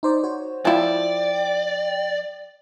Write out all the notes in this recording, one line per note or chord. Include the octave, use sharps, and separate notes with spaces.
D#4 C5 D5
F#4 C5 C#5
F3 E4 D5 G5